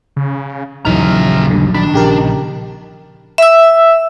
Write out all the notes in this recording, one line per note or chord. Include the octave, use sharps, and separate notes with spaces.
C#3
A#1 D#2 C#3 E3 F#3 D#4 A#5 F6
C#2 G2 D3
D#3 D4 B5
A#1 C#3 G4 A#4
E5 E6